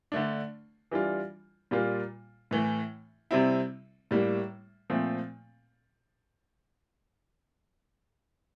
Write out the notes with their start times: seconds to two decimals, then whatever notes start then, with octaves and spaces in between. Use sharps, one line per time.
0.12 D3 A3 D4
0.91 E3 G3 D4 F4
1.71 A#2 G3 A#3 F4
2.51 A2 E3 A3
3.31 C3 G3 C4 E4
4.11 A2 G3 A#3
4.90 A#2 F3 A3 C4